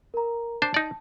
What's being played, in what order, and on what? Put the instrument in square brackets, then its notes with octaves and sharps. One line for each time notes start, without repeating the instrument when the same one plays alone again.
[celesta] A#4 A#5
[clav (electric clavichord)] D4 C5 [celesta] A5
[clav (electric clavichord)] D#4 D5